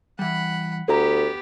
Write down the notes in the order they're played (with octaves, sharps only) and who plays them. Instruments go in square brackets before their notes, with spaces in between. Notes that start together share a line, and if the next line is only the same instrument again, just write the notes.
[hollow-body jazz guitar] E3 G3 [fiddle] F#5 B5
[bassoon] D2 [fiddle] B3 G4 [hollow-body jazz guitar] G#4 F#5 A#5